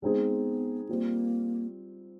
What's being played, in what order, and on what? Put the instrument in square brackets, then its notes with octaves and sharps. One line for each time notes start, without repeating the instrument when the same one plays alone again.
[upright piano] G#3 C4 D#4 G#4 [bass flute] B3
[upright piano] G3 C4 F4 [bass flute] A#3